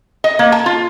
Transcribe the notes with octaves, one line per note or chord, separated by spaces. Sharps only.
D#5
A#3
A5
F4